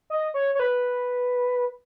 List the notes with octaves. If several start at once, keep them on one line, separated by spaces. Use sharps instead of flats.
D#5
C#5
C#5
B4